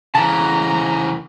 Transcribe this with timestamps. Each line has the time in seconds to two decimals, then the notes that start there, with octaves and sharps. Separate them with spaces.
0.15 C#3 E3 A5 A#5